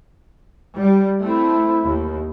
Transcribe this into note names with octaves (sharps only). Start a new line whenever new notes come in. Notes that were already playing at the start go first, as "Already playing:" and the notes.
G3
A3 C4 E4
D#2